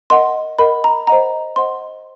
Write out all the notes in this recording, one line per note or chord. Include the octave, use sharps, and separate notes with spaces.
A#4 D#5 F#5 C6
A#4 D#5 F#5 B5
A#5
C5 D#5 F#5 A#5
C5 D#5 F#5 C6